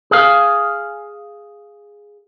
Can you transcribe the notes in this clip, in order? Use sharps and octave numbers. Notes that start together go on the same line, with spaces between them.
G#4 F5